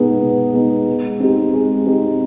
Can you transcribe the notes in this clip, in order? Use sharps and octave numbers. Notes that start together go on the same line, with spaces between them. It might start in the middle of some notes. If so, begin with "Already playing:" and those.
Already playing: B2 G#3 B3 D#4
B2
G#3 B3 D#4
G#3
C4 D#4 G4
G#3
C4 D#4 G4